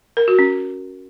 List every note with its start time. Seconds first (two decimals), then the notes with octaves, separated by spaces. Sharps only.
0.17 A#4
0.28 F#4
0.39 C#4